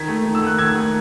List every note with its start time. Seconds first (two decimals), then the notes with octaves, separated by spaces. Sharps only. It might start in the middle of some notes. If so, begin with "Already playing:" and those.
Already playing: D#3 G#6 B6
0.08 A3
0.25 D#3
0.35 E6
0.42 A3 F#6
0.58 D#3 E6 G#6
0.76 A3